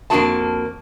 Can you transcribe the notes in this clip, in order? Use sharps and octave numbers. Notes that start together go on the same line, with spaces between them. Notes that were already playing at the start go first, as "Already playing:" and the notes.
F2 A#3 D4 F#4 G#4 A5